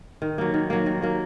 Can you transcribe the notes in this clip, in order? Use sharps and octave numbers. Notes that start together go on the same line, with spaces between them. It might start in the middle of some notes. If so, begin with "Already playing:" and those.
D#3
F#3 A#3
D#3
F#3 A#3
D#3
F#3 A#3